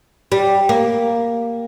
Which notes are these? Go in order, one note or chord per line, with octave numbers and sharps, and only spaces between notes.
G3
A#3